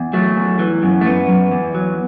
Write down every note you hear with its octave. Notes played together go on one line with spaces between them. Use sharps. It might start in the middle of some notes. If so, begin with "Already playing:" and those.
Already playing: E2
F#3 A3
E2
E3
F#2
A3
F#2 B3
F#2
E2
F#3